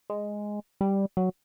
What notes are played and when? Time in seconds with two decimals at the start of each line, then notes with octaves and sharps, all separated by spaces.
0.10 G#3
0.81 G3
1.17 F#3